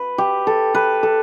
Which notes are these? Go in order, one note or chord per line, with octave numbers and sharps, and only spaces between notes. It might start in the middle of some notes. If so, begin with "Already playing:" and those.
Already playing: B4
G4
A4
B4
A4